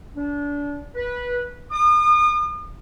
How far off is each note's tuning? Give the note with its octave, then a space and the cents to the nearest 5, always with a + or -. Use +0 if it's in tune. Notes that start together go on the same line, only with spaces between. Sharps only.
D4 -30
B4 -15
D#6 -40